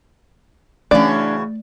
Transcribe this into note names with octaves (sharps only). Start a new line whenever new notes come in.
C#3 E3 A3 C#4 D4 F#4 D5